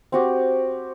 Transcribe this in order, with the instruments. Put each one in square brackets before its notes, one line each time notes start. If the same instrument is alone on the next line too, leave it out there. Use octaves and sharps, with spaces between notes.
[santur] C4 F#4 G4